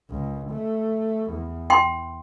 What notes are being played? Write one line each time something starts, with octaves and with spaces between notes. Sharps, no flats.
C#2
A3
E2
G5 C6